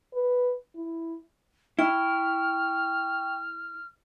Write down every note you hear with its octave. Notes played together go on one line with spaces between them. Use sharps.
B4
E4
E4 G5 C#6 F6